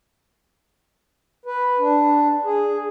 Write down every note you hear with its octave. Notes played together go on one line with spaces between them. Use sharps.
B4
D4
G#4